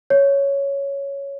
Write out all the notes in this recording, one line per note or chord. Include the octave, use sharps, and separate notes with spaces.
C#5